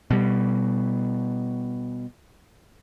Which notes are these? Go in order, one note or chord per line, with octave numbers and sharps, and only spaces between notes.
B2 G3